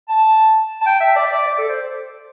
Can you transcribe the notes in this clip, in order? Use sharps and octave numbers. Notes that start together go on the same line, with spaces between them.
A5
A5
G5
E5
D5
E5
D5
D5
A4
C5